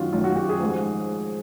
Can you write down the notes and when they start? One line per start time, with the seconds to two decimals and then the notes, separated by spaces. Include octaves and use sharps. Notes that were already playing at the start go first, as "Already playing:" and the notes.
Already playing: F#2 D#3 F4 F#4
0.13 F#2 D#3 F4
0.24 F#4
0.36 G4
0.49 G#4
0.60 G#2 F3